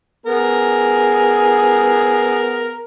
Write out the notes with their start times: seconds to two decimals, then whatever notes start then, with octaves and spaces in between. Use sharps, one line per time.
0.26 B3 G#4 A#4